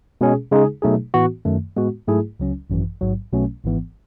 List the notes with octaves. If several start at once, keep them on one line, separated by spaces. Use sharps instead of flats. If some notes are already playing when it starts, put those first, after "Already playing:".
B2 G#3 C#4 G#4
C#3 G#3 D#4 G#4
B2 F#3 A3 D#4 G#4
A2 E3 B3 F#4
F#2 D#3 A3
A2 G#3 B3 F#4
G#2 F#3 A3 E4 G#4
C#2 C#3 F#3 C#4
G#1 F#2 E3
A1 G#2 F#3
B1 B2 F#3 A3 C#4
G#1 G#2 E3 B3